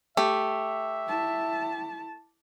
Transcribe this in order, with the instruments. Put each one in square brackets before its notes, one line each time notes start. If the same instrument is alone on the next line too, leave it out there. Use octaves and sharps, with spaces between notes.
[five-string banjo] A3 [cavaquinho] G4 [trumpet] E5
[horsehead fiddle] E4 A5